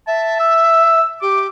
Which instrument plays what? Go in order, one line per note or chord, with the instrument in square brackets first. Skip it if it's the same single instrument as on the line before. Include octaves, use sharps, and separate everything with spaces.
[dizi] E5 [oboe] A5
[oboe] E6
[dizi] G4 [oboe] D6